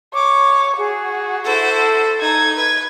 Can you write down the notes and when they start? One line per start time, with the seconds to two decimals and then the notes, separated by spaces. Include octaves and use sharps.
0.14 C#5 D6
0.78 F#4 G#4
1.44 E4 A4 C5
2.21 D#4 G#6
2.55 B4